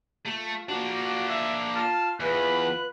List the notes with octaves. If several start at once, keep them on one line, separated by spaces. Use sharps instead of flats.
A3 F4
A#3 D4 F#4
E5
F4 A5 F6
E2 F4 B4 F#6